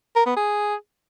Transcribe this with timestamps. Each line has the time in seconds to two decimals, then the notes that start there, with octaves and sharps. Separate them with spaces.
0.16 A#4
0.26 B3
0.37 G#4